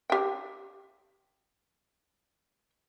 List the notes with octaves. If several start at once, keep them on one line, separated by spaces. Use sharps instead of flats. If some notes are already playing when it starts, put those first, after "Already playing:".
G4 G5